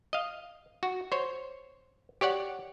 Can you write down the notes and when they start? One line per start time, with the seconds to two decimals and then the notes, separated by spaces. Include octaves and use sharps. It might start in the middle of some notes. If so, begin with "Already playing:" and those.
0.13 D#5 F5
0.83 F#4
1.12 C5 C#5
2.21 G4 C#5 D5 F#5